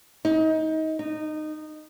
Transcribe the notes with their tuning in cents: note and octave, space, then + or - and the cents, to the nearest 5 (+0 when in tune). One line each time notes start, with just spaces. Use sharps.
D#4 +25
D#4 -20